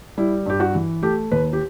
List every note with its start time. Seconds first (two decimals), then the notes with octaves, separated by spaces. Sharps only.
0.18 G3 E4
0.46 G2 G4
0.60 F#4
0.75 E3
1.03 A3 G4
1.32 D#2 B4
1.53 G4